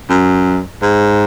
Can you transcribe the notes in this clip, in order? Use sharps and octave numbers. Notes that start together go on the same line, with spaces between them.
F#2
G#2